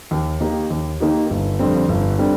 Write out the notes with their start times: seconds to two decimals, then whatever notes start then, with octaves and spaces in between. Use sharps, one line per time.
0.11 D#2
0.40 D#3 A#3 D#4 G4
0.70 D#2
1.00 D#3 A#3 D#4 G4
1.30 G1
1.59 F2 D3 G3 C4
1.89 G1
2.19 D3 G3 C4